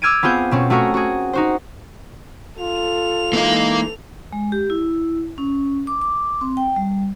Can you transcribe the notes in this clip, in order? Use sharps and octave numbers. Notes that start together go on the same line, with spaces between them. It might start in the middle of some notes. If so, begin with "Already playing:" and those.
D6 E6 F6 G#6 D7 D#7
B3 C4 F4 G#4 G6
B2 C4 C#4
A3 F#4 G#4 A#4
F#4 G#4
D#4 F#4 C5
F4 A4 F7
E3 G#3 A#3 D#4 F5
G#3
G4
E4
C#4
D6
D6
C4
G5
G3